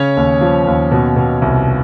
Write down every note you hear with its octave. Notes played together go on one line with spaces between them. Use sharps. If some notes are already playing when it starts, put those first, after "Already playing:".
Already playing: C#3 C#4 C#5
D#2
F3
D#2
B2
B2
C2